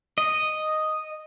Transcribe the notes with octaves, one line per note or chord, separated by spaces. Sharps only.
D#5